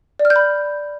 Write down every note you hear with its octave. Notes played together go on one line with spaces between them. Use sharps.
D5
F6
G6
B5